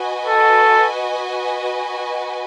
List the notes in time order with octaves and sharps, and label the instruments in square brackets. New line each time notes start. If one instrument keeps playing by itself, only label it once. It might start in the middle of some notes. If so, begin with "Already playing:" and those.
Already playing: [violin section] F#4 B4 D#5 G#5
[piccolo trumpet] A4